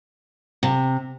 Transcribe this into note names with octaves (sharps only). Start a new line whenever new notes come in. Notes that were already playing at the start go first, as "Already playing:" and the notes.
C3